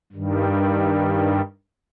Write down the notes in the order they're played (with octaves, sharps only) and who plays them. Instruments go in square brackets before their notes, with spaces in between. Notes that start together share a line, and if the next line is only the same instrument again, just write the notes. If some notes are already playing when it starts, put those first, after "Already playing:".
[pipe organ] G2 D#3 G3